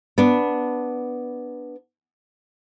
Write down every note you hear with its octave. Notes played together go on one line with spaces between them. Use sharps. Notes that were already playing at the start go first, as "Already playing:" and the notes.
B3 D4